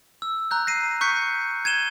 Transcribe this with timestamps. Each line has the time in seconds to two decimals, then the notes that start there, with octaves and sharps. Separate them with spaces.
0.22 E6
0.51 A#5 F#6 G6
0.67 A#6 C7 D#7
1.01 C#6 F#6 G6 B6 C#7
1.65 G#6 D#7 E7 G7